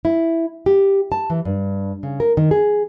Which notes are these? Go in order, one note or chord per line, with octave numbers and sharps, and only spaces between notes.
E4
G4
A5
E3
G2
C#3
A#4
D#3
G#4